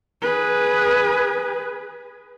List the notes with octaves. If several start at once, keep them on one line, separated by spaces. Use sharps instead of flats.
G#4 B4